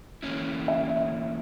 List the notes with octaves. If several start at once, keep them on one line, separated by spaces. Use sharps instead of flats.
E3 A#3 C#4 E4
E5